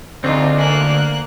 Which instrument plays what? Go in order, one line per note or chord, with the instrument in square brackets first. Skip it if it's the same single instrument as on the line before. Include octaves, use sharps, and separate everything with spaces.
[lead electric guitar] D2 [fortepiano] C4 D#4 [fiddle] F4
[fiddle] A#3 F#6 [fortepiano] G#5